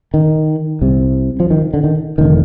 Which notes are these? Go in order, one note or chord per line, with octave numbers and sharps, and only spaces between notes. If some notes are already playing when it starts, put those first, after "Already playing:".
D#3
C2 C3
F3
D#3
D3
D#3
F1 D3 D#3